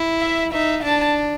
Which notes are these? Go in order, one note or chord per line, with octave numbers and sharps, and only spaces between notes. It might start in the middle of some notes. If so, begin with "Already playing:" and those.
Already playing: E4
E5
D#4 E5
D4 A5